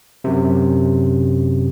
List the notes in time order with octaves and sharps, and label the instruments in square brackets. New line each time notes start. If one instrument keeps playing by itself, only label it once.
[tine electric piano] F#2 C3